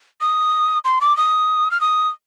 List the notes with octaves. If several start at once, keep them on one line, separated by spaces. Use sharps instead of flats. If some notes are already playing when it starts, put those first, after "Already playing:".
D#6
C6
D6
D#6
F6
D#6